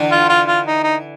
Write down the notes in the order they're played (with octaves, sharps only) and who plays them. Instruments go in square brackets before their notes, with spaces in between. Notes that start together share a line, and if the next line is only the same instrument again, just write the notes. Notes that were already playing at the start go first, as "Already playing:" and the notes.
Already playing: [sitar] D3 E3
[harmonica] F4
F4
F4
D#4
D#4